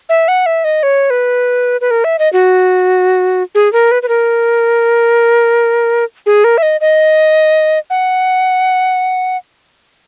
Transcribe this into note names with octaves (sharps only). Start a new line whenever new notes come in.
E5
F#5
E5
D#5
C#5
B4
B4
A#4
E5
D#5
F#4
G#4
A#4
B4
B4
A#4
G#4
A#4
E5
D#5
D#5
F#5